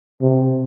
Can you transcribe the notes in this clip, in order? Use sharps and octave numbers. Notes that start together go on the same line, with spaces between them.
C3